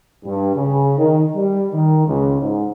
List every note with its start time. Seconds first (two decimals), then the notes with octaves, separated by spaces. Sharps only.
0.24 G2
0.54 C#3
0.98 D#3
1.35 G3
1.73 D#3
2.06 C#2
2.40 G#2